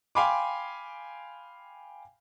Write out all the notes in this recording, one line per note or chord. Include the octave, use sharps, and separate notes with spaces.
F5 G5 G#5 B5 C6 D6